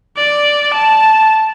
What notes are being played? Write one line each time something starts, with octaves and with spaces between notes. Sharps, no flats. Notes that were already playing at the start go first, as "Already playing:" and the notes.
D5
A5